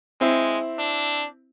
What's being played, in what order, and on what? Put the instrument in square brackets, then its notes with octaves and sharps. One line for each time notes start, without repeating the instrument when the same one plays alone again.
[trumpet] G#3 [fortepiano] C4 E4
[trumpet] D4